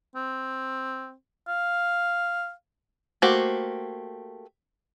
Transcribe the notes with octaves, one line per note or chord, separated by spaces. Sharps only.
C4
F5
A3 A#3 F#4 G4 C5